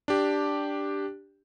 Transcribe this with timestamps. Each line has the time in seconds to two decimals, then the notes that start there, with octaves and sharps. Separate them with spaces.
0.08 D4 G4